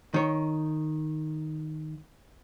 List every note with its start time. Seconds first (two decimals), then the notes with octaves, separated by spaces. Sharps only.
0.14 D#3 C#5